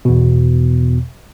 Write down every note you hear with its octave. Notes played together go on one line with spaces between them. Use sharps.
E2 B2